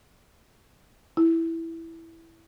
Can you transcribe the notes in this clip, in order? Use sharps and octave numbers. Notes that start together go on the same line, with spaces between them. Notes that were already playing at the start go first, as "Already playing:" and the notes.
E4